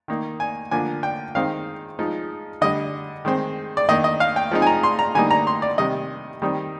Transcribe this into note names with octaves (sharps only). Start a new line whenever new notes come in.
D#3 A#3 D#4
G#5
D3 F3 A#3 D4 G#5
G5
D#3 G#3 C4 D#4 F5
F3 G#3 D#4
D3 G3 D4 D#5
D#3 G#3 C4
D5
D#3 A#3 D4 D#5
D#5
F5
G5
F3 G#3 C4 D#4
G#5
A#5
C6
A#5
D3 G3 A#3 D#4 G#5
A#5
C6
D5
C3 D#3 G3 D#5
D#3 G3 C4 D#4